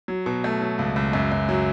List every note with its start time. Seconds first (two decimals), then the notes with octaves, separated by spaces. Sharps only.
0.08 F#3
0.26 B2
0.44 A3
0.61 F#3
0.79 C#2
0.96 C#2
1.13 F#2
1.32 F#2
1.48 F#3